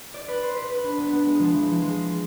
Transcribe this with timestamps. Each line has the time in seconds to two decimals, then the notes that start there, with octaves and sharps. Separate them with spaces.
0.14 D5
0.28 B4
0.43 C5
0.56 B4
0.70 B4
0.84 D4
0.98 B3
1.12 B3
1.26 G#3
1.39 F3
1.54 E3
1.68 F3
1.82 G#3